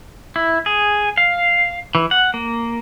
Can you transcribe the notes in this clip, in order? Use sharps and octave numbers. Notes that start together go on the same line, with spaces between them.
E4
G#4
F5
E3
F#5
A#3